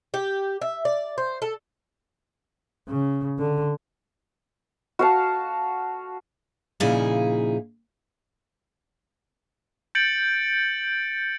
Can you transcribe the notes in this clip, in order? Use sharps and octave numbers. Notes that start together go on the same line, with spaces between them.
G4
E5
D5
C5
A4
C#3
D3
F#4 F5 A5
A#2 C#3 F3 D#4 E4 G#4
G6 A6 C#7 D7 F#7